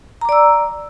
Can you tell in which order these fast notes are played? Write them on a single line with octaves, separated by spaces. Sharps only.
A#5 D6 D5 E6